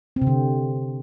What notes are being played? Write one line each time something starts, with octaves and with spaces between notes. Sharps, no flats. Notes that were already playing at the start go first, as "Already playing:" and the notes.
C4
C3
D3